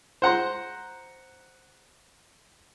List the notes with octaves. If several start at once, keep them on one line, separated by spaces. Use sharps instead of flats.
C5 F#5 A#5 C6